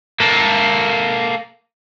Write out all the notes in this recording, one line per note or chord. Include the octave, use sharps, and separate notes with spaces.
A#3 A4